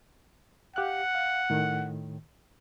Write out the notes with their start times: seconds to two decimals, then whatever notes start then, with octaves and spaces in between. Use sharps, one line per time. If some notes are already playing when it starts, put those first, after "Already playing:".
0.76 G4 F5 F#5 F#6
1.15 F5
1.50 A2 D#3